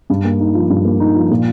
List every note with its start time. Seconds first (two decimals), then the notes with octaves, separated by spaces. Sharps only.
0.10 G2
0.24 A#3
0.40 D#4
0.55 F3
0.70 G2
0.85 A#3
1.00 D#4
1.16 F3
1.31 A#2